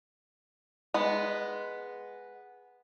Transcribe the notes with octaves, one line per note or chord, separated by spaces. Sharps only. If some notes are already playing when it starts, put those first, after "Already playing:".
G#3 B3